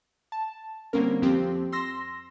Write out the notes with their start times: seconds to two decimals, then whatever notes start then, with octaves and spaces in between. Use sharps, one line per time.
0.32 A5
0.93 D3 G3 A#3 C4 C#4 A#4
1.22 F2 F3 C4 G4
1.72 C6 E6 A#6